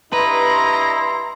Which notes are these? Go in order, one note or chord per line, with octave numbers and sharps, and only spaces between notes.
G2 E4 B4 D#5 A#5 C6